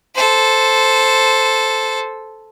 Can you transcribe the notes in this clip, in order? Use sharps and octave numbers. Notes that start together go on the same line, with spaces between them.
A4 C5